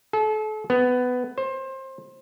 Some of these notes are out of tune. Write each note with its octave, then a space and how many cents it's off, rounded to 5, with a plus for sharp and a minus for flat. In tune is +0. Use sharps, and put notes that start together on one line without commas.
A4 -35
B3 +15
C5 +25